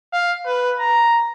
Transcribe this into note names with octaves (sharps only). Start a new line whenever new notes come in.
F5
B4
A#5